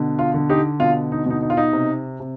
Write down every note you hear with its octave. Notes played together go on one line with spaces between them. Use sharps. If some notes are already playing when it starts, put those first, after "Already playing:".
Already playing: B2 D3
F4
D3
D#4 G4
B2 F4
D#4
B2 D#4
D#4
F4
D#4
C3
C3